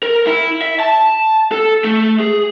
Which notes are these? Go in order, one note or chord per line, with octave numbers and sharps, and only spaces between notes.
A#4
E4
E5
A5
A4
A3
G#4